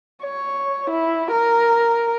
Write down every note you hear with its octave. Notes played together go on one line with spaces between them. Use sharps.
C#5
E4
A#4